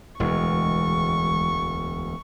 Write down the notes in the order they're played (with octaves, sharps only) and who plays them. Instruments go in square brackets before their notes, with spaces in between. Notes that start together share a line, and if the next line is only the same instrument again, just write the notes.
[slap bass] E1 D2 [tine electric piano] E3 G#3 [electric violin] C#6